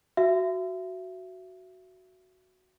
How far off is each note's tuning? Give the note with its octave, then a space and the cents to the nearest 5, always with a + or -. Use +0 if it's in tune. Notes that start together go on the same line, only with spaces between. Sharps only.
F#4 +0 E5 +30